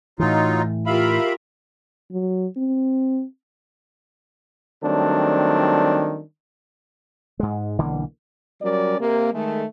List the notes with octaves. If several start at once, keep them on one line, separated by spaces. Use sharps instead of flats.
A2 E3 F#3 D#4 F4
F4 G4 A#4 E5 F5 B5
F#3
C4
D#3 F#3 G3 A3 C4 D4
G#2 G#3
B1 D3 E3 A#3
F#3 G3 C#4 A#4 D5
C3 A#3
D#3 G#3 A3